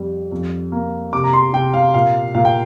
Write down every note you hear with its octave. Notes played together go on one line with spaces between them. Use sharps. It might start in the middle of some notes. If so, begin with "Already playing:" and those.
Already playing: F2 G3
F2
A#3
C3 D6
A#5
C6
C3 G5
F5
A#2 F5
A#2 F5
G5